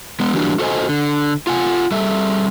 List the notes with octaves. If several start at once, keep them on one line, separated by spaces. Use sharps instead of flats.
G#3 B3
E3 F#3 G3 A#3 D4 F#4
F#4 A4 C5 D#5 G#5
D3
F4 F#5 G#5
G3 A4 E5